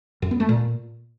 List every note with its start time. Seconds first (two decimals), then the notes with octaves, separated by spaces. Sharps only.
0.22 F#2
0.31 B3
0.40 A3
0.49 A#2